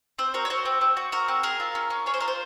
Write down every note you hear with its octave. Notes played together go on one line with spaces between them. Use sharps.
C4 C5
F#4 A#4
C#5
F#4 C5
C4
C4
F#4
F#4 A#4
C4
G#4 A#4
F4
C#4
C#4
G#4 C#5
C5
F4 A#4
C5